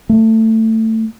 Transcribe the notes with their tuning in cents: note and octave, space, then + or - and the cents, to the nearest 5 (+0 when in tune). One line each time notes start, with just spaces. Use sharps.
A3 +20